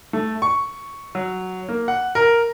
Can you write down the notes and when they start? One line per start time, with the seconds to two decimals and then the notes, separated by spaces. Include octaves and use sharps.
0.13 A3
0.42 C#6
1.15 F#3
1.69 A#3
1.88 F#5
2.15 A#4